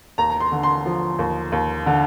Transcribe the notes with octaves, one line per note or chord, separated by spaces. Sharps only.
D#2 A#5
A#5
C6
D3
C6
F3
D#2
D#2
D3